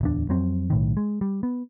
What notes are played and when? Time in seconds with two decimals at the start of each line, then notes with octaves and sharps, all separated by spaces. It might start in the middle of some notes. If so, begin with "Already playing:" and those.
0.01 D1 E2 D4
0.29 F2 F#3 C4
0.70 B1 A2 D#3
0.97 G#3
1.21 G3
1.43 B3